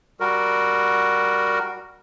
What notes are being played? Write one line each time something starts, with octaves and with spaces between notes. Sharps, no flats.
G3 F#4 A#4